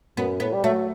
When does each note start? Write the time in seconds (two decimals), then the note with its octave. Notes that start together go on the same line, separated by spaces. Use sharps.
0.17 F#2 B3
0.40 A2 B3
0.53 G3
0.64 F#3 A3